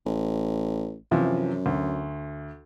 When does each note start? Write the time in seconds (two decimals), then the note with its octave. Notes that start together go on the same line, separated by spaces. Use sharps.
0.06 A1
1.11 F#2 C3 E3 F3
1.66 D2